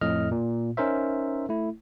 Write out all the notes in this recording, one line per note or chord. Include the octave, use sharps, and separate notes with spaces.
F2 A2 D#5 F6
A#2
C#4 D#4 A#4 C5 E5
A3 E4